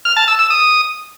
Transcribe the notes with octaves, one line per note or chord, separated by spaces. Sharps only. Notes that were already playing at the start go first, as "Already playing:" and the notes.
F6
A5
E6
E6
D#6